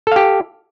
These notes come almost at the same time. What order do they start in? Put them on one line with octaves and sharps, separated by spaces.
A4 F5 G4